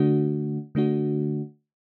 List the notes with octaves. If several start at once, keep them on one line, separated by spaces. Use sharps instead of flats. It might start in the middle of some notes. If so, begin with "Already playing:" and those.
Already playing: D3 A3 D4 F#4
D3 A3 D4 F#4